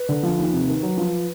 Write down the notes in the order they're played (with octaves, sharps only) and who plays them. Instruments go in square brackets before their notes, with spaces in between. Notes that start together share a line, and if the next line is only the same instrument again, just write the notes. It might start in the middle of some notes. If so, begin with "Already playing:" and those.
Already playing: [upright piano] B4
D3
F3
D#2
C3
D#3
F#3
F3